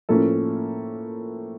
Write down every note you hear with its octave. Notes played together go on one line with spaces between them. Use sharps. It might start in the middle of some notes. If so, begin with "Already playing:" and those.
A2 F3 A#3 C#4 A4